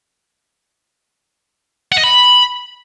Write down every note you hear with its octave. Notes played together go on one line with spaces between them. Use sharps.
F#5
D#5
B5